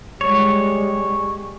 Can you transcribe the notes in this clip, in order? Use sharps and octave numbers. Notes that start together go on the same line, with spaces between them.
G3 G#3 C#5